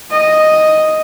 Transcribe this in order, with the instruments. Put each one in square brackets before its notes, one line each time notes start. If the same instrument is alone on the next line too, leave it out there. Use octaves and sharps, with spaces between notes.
[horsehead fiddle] D#5